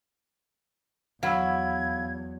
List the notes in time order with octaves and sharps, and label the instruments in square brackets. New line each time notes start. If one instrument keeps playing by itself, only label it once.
[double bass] E2 [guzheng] F#3 [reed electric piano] F5 B5 E6 [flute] G#6